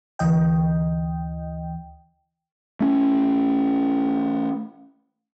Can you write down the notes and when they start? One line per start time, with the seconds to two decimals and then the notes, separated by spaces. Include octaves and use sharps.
0.19 D2 E3 D#5 G5
2.80 A3 C#4